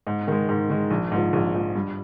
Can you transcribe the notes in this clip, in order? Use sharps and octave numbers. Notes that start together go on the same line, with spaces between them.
G#2
D#3 G#3
G#2
D#3 G#3
A#1
G#2 F3
A#1
G#2 F3
G2